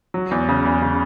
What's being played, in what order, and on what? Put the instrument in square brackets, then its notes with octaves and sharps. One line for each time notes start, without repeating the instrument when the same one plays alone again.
[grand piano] F#3
E2
C#3
E2
C#3